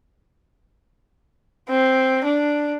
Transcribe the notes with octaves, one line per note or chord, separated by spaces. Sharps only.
C4
D4